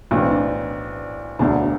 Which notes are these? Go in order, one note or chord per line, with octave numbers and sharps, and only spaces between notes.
B1 A2 E3 D4
C4
D4
E1 D2 D3 D4